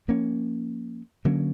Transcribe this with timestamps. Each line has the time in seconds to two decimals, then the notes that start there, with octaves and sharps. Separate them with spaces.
0.08 F3 A#3 C#4
1.25 D3 F#3 A#3 C#4